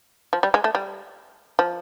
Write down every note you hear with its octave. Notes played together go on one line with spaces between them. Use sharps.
F3
G3
G#3
A3
G3
F3